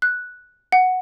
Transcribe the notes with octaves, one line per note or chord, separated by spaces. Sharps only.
F#6
F#5